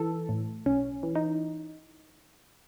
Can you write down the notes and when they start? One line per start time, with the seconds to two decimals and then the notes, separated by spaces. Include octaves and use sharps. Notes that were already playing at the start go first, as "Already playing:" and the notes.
Already playing: E3 A4
0.29 A2
0.66 B1 C#4
1.03 E3
1.15 D#4